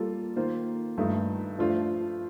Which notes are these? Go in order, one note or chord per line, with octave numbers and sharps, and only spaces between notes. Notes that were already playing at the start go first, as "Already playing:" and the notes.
Already playing: G3 A#3 F4 A4
D#3 A#3 F4 C5
G2 D#3 A3 D#4
F3 A3 D4 F4 C5